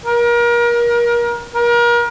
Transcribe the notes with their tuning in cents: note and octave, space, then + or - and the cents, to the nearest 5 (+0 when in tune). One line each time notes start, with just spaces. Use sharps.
A#4 +30
A#4 +35